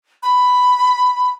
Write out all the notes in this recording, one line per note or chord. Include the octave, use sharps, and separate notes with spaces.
B5